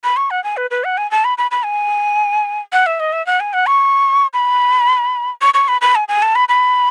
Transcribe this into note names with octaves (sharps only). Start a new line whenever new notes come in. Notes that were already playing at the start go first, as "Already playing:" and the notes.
B5
C#6
F#5
G#5
B4
B4
F#5
G#5
A5
B5
B5
B5
G#5
F#5
E5
D#5
E5
F#5
G#5
F#5
C#6
B5
C#6
C#6
B5
B5
G#5
G#5
A5
B5
B5